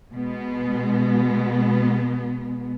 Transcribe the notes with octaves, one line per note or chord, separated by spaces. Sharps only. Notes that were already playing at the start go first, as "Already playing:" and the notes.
B2 G#3 B3